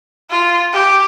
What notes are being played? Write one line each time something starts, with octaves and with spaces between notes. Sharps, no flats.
F4
G4